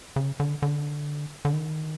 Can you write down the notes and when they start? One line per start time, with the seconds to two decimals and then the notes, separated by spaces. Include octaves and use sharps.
0.16 C#3
0.40 D3
0.62 D3
1.45 D3
1.53 D#3